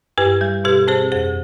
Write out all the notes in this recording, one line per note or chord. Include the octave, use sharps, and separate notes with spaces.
G2 G4 B4
G3
B2 G4 B4
C4 G#4 C5
F2 G#4 C5